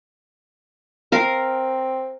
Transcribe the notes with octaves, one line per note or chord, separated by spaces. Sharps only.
C4 A#4 F5